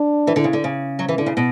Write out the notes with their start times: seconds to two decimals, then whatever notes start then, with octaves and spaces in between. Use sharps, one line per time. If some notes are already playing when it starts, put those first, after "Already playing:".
Already playing: D4
0.27 E3
0.36 D3
0.44 C#3
0.53 D3
0.64 C#3
0.99 F#3
1.08 E3
1.18 D3
1.26 C#3
1.37 B2